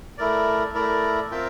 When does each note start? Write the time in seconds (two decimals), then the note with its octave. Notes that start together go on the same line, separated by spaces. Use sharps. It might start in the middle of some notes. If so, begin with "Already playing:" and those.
0.18 A3 E4 A#4 D5
0.74 A3 E4 A#4 D5
1.31 C4 F4 A#4 E5 G5